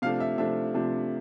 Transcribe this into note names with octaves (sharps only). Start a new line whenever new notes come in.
C3 F3 A3 D4 F5
E5
C3 F3 A3 D4 E5
C3 F3 A3 D4